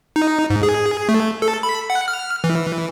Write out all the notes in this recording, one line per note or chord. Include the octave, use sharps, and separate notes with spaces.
D#4
G#2
G#4
A3
A4
B5
F#5
F6
E3